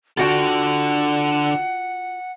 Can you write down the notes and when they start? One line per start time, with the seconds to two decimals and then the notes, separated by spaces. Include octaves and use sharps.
0.17 D3 F4 F#4 A4 F#5 G5